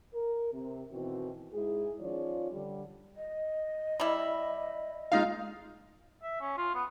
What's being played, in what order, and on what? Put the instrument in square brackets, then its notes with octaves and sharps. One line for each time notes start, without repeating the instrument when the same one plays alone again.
[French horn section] A#4
C3
B2 D#3 E3 C4 F#4
G#2 G#3 E4 G#4
D#3 F3 C#4 F4 C#5 D5
D3 G3
[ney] D#5
[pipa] G3 E4
[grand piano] G#3 D#4 F4 [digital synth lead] F5
[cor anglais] E5
C#4
F4
B3